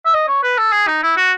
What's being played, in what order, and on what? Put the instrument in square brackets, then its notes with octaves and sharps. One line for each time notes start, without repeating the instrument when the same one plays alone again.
[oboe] E5
D#5
C#5
B4
A4
G#4
D#4
E4
F#4